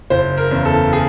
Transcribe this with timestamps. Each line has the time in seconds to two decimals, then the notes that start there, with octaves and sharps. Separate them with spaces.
0.10 F#1 C5
0.37 A#4
0.51 E2 C#3
0.65 A4
0.93 G#4